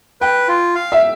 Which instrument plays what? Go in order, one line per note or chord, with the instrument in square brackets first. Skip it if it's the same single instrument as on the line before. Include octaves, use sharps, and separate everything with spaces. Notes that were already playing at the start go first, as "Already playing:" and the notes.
[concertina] B4 [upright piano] G5
[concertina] F4
F5
[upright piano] E5